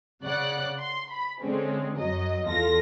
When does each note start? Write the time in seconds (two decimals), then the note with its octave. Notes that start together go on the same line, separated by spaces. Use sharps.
0.24 C#3 D5 F#5 F#6
0.79 C6
1.10 B5
1.40 D3 G#3 C4 C#4
1.97 F#2 F#3 D#5
2.47 E2 F4 A4 A#6